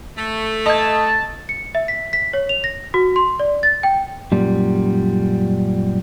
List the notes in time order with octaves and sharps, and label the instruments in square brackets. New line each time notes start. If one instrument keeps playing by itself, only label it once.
[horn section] A3
[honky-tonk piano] D#5 G#6 [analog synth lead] A5
[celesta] C#7
E5
B6
B6
C#5
F7
A#6
F#4
C6
D5
A6
G5
[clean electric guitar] F#2 A#2 G3